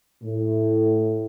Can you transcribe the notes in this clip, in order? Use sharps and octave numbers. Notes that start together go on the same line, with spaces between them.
A2